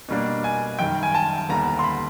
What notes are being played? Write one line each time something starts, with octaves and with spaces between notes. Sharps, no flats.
B2 G3 A#3 D4
G#5
F#2 D#3 G3 G5
G#5
A5
D#2 D3 G3 B3 A#5
C6
B5